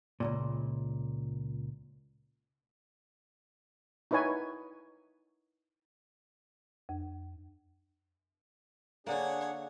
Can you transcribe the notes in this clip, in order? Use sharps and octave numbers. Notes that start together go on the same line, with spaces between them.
C#2 F#2 A#2
D#4 E4 B4 C#5 G#5
F2
D3 A#3 D4 G#4 C#5 F#5